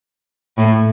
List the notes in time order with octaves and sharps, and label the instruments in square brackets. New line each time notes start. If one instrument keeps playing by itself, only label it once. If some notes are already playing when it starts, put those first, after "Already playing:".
[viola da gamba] A2